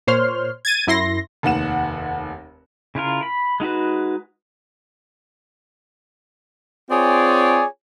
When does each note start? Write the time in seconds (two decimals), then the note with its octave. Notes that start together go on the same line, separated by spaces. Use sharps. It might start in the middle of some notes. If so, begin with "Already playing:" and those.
0.07 A#2 C5 C#5 C6 F6
0.65 G#6 A6 D#7
0.87 F#2 E4 C6 A#6
1.43 F1 D#2 F#5 E7
2.95 C#3 E4 F4 A#4
3.23 B5
3.60 G#3 D#4 F#4 B4
6.90 C4 F4 G#4 C#5 D5 G#5